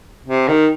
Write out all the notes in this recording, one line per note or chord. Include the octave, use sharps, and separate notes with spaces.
C3
D#3